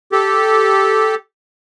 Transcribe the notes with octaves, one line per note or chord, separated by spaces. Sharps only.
G4 A4